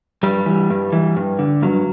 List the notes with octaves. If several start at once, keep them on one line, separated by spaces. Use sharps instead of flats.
G2 G3
E3
G2
E3
G2
D3
G2 F#3